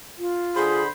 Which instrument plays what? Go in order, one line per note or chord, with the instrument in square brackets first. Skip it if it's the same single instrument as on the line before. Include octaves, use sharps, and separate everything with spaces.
[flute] F4
[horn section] D3 C5 B5 [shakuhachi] G#4